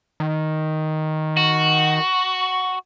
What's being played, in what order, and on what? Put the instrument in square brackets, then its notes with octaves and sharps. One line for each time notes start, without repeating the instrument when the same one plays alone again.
[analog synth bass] D#3
[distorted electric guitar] F#4